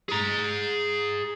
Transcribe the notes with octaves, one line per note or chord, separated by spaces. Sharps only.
G#4 A#5